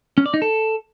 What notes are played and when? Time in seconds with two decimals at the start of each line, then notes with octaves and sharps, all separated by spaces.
0.18 C#4
0.26 D5
0.34 D#4
0.42 A4